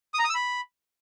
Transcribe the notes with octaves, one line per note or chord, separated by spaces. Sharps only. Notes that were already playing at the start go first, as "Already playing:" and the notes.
D#6
A#5
D#6
E6
B5